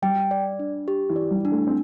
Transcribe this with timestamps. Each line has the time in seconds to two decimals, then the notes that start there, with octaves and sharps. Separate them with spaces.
0.02 G3 G5
0.31 D5
0.59 D4
0.88 G4
1.10 E3
1.16 D5
1.31 G3
1.45 D4
1.52 A3
1.67 C4